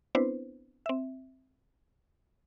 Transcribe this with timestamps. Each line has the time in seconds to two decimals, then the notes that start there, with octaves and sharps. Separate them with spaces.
0.15 B3 C4 D4 E4 B4 C5
0.86 C4 E5